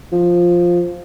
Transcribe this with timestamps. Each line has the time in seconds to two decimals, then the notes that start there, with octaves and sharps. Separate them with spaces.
0.12 F3